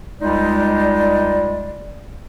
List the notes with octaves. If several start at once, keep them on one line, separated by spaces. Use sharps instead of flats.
C#2 G3 G#3 D#4 D5